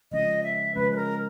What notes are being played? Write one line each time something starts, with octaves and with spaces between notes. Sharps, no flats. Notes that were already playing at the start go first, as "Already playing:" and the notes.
C#3 F3 G#3 C#4 D#5
E5
C#3 F3 G#3 C#4 B4
B4
A#4